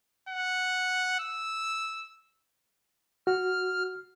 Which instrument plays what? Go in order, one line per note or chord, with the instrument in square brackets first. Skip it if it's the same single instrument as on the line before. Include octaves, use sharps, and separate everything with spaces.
[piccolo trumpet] F#5
E6
[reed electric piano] F#4 [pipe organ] F6